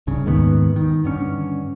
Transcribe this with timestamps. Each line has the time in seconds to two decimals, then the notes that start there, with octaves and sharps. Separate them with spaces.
0.07 C2 G2 C#3
0.26 D#2 G#2 D#3 B3
0.76 D#3
1.04 G2 D3 C#4